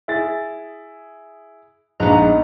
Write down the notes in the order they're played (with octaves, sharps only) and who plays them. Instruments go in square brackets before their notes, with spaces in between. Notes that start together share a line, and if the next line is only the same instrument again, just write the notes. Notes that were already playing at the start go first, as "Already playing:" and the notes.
[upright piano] E4 G#4 A6
[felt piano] A#1 [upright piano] G#2 [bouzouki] B3 F#5 A#5 [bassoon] D#4